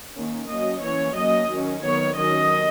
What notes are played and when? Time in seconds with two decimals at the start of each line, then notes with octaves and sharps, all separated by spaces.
0.14 D#3 A#3 C#4
0.49 F#3 A#3 C#4 D#5
0.83 E3 A#3 C#4 C#5
1.16 F#3 A#3 C#4 D#5
1.50 D#3 F#3 C#4
1.84 D#3 F#3 B3 C#5
2.17 D#3 F#3 C#4 D#5